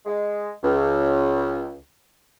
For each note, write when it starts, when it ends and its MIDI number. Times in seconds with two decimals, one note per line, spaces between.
0.06 0.49 56
0.64 1.73 37